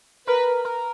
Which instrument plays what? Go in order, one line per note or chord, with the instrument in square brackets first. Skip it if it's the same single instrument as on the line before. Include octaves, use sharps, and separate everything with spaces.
[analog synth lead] A#4 [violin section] B4
[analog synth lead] A#4